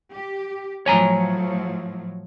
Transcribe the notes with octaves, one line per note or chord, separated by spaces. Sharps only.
G4
A2 F3 F#3 C#5 G#5 A#5